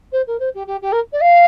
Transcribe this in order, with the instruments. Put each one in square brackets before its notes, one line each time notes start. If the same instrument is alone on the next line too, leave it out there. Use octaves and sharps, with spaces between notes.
[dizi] C5
A#4
C5
G4
G4
G4
A#4
D5
F5